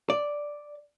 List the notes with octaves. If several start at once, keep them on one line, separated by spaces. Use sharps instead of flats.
D5